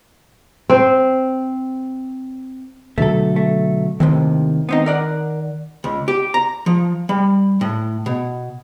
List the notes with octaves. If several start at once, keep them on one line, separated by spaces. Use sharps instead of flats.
C4 C5
B2 D3 F#3 A3 A4
A3
D#2 A2 C3 D#3
B3 C4 D#4
A#4 D5 F#5
C#2
G4
A#5
F3
G3
A2
B2